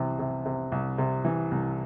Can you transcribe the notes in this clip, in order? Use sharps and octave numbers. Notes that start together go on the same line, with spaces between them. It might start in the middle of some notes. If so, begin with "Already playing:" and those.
Already playing: C2 C3 E3
C3
C3
C2
C3
E3
C2